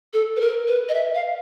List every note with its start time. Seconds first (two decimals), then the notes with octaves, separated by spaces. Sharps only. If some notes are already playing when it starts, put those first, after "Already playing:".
0.13 A4
0.36 B4
0.41 A#4
0.67 B4
0.89 D#5
0.94 E5
1.15 F5